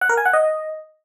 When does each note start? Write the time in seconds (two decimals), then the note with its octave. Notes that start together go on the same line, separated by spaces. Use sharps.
0.01 F#5
0.09 A#4
0.17 G#5
0.25 F#5
0.33 D#5